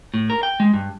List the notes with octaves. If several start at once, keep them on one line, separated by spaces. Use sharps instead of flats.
A2
A#4
G5
G#3
G2